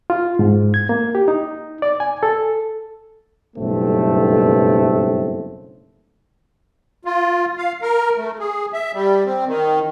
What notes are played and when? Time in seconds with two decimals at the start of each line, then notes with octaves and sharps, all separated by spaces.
0.10 F4
0.39 G#2
0.74 G#6
0.89 A#3
1.15 G4
1.28 D#4
1.82 D5
2.00 G#5
2.23 A4
3.56 F#1 B1 G2 A3 C4
7.05 F4
7.58 F5
7.82 A#4
8.17 A3
8.39 G#4
8.73 E5
8.93 G3
9.25 C4
9.47 D#3